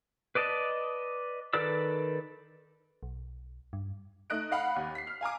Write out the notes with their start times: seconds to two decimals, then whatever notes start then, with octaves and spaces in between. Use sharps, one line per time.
0.35 B4 D5 D#5 A5
1.53 D#3 A4 B4 D5 E6
3.03 B1
3.73 G2
4.30 A3 D#4 D#5 F#6 D7
4.51 D#5 F5 F#5 B5
4.76 D#2
4.95 B6 C7
5.07 F6
5.21 F5 G#5 A#5 D6